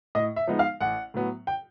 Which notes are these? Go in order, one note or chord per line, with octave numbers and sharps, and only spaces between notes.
A2 D#5
E5
F3 G#3 B3 D#4
F5
A1 F#5
A2 F#3 B3
G5